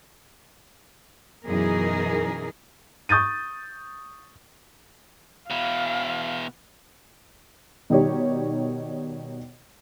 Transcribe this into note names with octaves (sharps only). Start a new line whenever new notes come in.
F#2 B2 E3 D#4 G#4 A#4
C#6 D#6 G6 A6 D#7
B2 E4 F5
B2 D#3 G3 D#4 G4 C#5